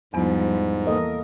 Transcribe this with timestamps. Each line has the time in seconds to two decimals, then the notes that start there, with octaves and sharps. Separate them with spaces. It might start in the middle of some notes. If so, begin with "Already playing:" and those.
0.14 E2 G#2 F3 G3 B3
0.87 E3 A#3 A4 A#4 D#5